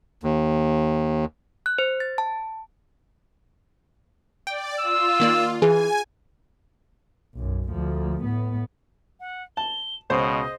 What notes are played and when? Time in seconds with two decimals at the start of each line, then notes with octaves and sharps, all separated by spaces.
0.23 D#2
1.66 F#6
1.79 C5
2.00 A6
2.18 A5
4.47 D5 G5
4.80 F4 E6
5.20 D#3 A#3 D5
5.62 E3 G#4 G#5
7.35 B1 F#2
7.71 D2 F3
8.24 A2 B3
9.20 F#5
9.57 A5 G7
10.10 C#2 B2 C#4 C5 D#5